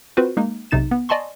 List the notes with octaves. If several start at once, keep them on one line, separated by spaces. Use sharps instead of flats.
C4 F4 F#4 B4 C5
G#3 A#3 D#4
B1 C3 D#4 A6 E7
B3
D5 D#5 G#5 A5 C6 C#6